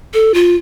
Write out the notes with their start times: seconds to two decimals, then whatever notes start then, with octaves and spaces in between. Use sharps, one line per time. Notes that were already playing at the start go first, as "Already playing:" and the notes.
0.14 A4
0.34 F4